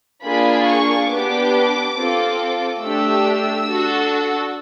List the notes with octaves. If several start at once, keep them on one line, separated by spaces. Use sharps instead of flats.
A#3 D4 F4 G#4 B5
C#6
B3 D4 G4 D6
C4 F4 A4
A3 D4 G4 E6
D4 F#4 A4